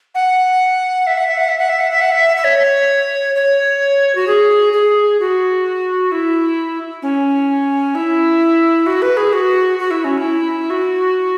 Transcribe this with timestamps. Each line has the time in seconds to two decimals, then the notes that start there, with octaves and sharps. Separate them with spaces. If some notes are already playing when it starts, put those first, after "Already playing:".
0.15 F#5
1.07 E5
1.17 F#5
1.27 E5
1.38 F#5
1.49 E5
1.58 F#5
1.69 E5
1.81 F#5
1.91 E5
2.01 F#5
2.12 E5
2.37 E5
2.44 C#5
3.35 C#5
4.15 F#4
4.27 G#4
4.73 G#4
5.20 F#4
6.12 E4
7.02 C#4
7.95 E4
8.87 F#4
9.02 B4
9.17 G#4
9.33 F#4
9.79 F#4
9.91 E4
10.04 C#4
10.18 E4
10.70 F#4